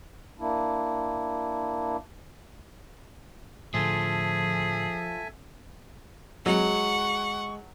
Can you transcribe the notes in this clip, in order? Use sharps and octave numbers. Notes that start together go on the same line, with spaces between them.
A#3 D4 E4
A2 D3 F3 G#4 A4 E5 G#5
F#3 G#3 F#5 C#6